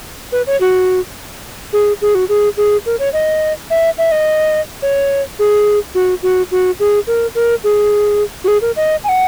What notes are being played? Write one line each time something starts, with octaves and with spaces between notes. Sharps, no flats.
B4
C#5
F#4
G#4
G#4
F#4
G#4
G#4
A#4
C#5
D#5
E5
E5
D#5
C#5
G#4
F#4
F#4
F#4
G#4
A#4
A#4
G#4
F#4
G#4
A#4
D#5
G#5
F#5